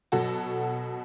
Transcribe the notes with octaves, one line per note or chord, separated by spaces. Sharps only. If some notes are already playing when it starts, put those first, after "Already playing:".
B2 F#3 F#4 A4